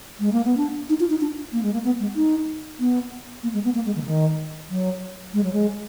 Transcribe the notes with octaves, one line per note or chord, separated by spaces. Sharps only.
G#3
A#3
B3
D4
D#4
F4
D#4
D4
A#3
G#3
A#3
B3
G#3
D#4
B3
A#3
G#3
B3
A#3
G#3
D#3
D3
D#3
F#3
G#3
F#3
G#3